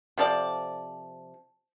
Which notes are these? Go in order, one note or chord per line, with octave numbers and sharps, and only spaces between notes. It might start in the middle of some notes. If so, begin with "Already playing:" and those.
C3 F3 A4 D5